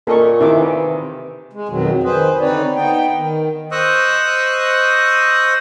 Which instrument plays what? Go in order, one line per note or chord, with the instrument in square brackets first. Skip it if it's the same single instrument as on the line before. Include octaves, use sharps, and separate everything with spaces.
[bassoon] A#2 [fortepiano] A#3 A#4 D#5 [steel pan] A4 C#6
[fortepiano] C3 D#3 [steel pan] E4 E5 D6
[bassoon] E3
[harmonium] G#3
F2 B2 D#3 F#3
D#3 G#4 B4 C5
D3 C4 D#4 B4 C#5 D5
B3 D#4 G5
D#3
[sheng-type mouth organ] C5 D#5 C#6 D#6 E6 F#6